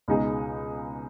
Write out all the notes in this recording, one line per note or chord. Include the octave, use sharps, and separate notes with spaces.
C#2 B2 G#3 D#4 G#4